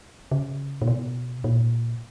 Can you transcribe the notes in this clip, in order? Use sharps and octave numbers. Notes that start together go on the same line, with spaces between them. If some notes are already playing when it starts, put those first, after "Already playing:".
C#3
A#2
B2
A#2